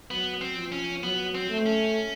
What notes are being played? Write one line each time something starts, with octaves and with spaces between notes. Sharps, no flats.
F#3 B3
C4
F3
C#4
F#3 B3
C4
A3
C#4